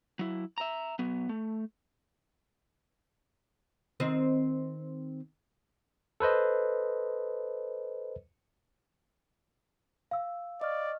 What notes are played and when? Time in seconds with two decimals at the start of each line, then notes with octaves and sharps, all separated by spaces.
0.19 F#3 E4
0.58 E5 A#5
0.99 F#3 B3
1.29 A3
4.00 D#3 C4 D#5
6.20 A4 B4 C5 D#5
10.11 F5 E6
10.61 D5 D#5 C#6 F6